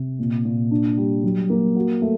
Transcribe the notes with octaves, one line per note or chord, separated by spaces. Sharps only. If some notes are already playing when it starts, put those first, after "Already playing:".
Already playing: C3
A#2
A#2
D4
G3
F#3
A#3
F#4
A3